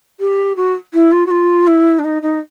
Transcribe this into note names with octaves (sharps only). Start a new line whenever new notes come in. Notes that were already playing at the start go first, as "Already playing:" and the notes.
G4
F#4
E4
F4
F#4
F4
E4
D4
D#4
D#4